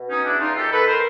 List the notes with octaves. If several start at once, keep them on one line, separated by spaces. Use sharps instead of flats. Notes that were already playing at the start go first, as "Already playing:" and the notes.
Already playing: B2
C#4 D#4
E2 D4 E4
D#4 F4
D#3 G4 A4
A4 B4
A#4 C5